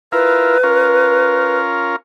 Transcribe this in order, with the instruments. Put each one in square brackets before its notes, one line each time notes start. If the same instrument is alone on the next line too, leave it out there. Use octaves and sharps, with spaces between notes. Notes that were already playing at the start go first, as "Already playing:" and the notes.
[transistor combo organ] E4 F4 A#4 [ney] B4
[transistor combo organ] C#4 F4 A#4